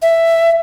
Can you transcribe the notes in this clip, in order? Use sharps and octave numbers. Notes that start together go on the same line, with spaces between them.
E5